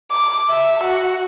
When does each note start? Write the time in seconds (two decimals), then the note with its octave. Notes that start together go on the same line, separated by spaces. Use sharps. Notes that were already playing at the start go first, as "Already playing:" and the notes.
0.11 D6
0.49 E5
0.83 F#4